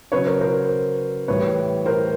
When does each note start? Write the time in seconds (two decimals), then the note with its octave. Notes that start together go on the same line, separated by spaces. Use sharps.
0.12 C#3 F#3 B4 C#5
0.26 A#4 C5
0.41 A#4 C5
1.28 A2 E3 G3 B4 C#5
1.86 A#4 C5